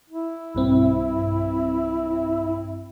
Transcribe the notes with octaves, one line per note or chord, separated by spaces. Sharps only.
E4
B1 G2 C4